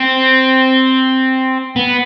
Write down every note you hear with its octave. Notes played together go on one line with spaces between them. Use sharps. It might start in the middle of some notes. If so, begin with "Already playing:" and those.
Already playing: C4
B3